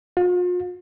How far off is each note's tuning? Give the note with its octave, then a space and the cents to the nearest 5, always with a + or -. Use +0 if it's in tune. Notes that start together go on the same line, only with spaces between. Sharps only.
F4 +40